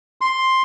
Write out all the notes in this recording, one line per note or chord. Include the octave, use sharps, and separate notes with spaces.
C6